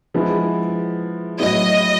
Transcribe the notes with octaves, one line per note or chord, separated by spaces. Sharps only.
F3 G#3 B3 E4
A2 F#3 B3 E4 D#5